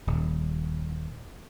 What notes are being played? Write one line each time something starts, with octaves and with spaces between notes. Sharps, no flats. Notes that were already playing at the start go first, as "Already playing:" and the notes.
D#1